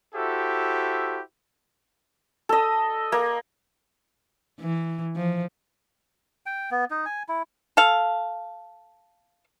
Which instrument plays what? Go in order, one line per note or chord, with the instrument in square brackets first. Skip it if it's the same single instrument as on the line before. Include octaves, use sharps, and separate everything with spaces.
[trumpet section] E4 F#4 G4 A4 C5 E5
[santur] A4 D#5
A#3
[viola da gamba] E3
F3
[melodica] G5
B3
D#4
G#5
E4
[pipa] A4 F5